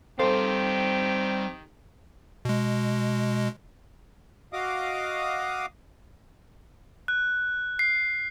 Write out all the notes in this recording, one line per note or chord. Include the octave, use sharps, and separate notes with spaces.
D#3 G3 C4 G4 A4 C5 F5
B2 G#3
F#4 D#5 F5 D6 D#6
F#6
C7